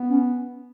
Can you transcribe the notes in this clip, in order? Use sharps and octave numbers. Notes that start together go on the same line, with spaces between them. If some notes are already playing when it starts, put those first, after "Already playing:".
Already playing: B3
C#4